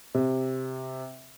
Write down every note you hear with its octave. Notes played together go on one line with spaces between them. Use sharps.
C3